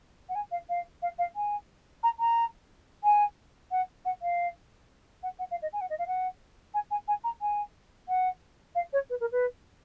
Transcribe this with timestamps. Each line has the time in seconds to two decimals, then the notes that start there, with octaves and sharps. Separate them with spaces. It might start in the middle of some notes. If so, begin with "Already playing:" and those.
0.29 F#5
0.35 G#5
0.51 F5
0.69 F5
1.02 F5
1.19 F5
1.36 G#5
2.03 A#5
2.20 A#5
3.04 G#5
3.71 F#5
4.05 F#5
4.22 F5
5.23 F#5
5.39 F#5
5.51 F5
5.62 D#5
5.73 G#5
5.81 F#5
5.90 D#5
5.99 F5
6.07 F#5
6.74 G#5
6.91 G#5
7.08 G#5
7.24 A#5
7.41 G#5
8.09 F#5
8.75 F5
8.93 C#5
9.10 B4
9.21 A#4
9.32 B4